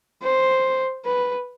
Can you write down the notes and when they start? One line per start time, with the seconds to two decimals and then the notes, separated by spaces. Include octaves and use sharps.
0.23 C5
1.05 B4